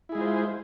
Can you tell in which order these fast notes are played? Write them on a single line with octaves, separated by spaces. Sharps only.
E4 G#4 G#3 F4 C5